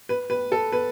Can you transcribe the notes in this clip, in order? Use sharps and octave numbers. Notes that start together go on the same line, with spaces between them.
B4
B4
A4
B4